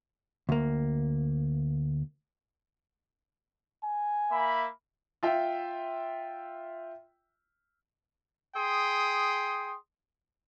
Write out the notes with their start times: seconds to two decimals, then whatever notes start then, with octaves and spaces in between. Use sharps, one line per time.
0.49 D2 A#3
3.83 G#5
4.31 A#3 E5 B5
5.23 F4 E5 G5
8.56 G#4 G5 C6 D#6